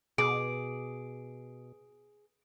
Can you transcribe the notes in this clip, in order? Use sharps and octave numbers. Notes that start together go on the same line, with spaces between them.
B2 G#4 D6 D7